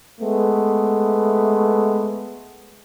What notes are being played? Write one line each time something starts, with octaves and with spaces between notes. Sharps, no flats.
G#3 A3 B3